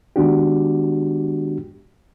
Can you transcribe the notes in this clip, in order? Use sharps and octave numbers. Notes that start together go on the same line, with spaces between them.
D#3 G#3 B3 D4 F#4 G4